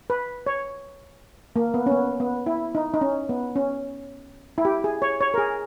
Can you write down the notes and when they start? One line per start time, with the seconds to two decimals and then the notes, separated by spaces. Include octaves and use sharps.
0.10 B4
0.46 C#5
1.56 A#3
1.74 B3
1.86 C#4
1.92 B3
2.20 B3
2.46 E4
2.75 D#4
2.94 D#4
3.01 C#4
3.29 B3
3.56 C#4
4.58 E4
4.65 G4
4.84 G#4
5.02 C#5
5.21 C#5
5.34 A#4
5.38 G#4